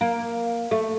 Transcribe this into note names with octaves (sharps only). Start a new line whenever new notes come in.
A#3
A3